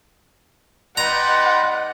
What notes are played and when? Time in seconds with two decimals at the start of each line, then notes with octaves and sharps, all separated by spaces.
0.97 G3 D#4 B4 F#5 A#5 C6